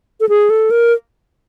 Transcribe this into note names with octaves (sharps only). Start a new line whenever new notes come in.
A4
G#4
A4
A#4